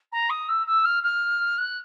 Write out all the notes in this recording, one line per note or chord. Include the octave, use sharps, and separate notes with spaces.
A#5
D#6
E6
E6
F6
F6
F#6